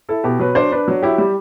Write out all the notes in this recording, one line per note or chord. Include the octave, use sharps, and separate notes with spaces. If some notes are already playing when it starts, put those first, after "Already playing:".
E4 A4
B2 G4
F#3 B4
D4 C5
D4 B4
F#3
E4 G4
G3